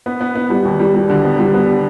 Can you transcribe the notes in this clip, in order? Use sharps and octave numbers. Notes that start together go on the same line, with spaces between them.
B3
B3
B3
G3
D#2
G3
G3
D3
B3
G3
B3